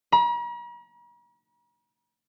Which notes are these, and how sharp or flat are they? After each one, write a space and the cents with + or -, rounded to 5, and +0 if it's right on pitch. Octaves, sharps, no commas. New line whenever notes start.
A#5 +45